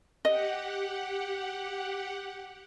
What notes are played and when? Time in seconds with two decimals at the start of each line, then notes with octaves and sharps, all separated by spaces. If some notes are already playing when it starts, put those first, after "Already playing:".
0.25 G4 D#5 F#5